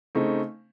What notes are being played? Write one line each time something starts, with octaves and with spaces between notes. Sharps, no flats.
C#3 A3 C4 D#4